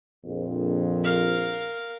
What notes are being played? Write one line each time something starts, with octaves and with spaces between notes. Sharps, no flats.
A#1 F2
A#4 F5